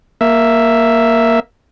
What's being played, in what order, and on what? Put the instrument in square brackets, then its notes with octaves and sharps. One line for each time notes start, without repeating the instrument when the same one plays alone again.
[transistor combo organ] A#3 E5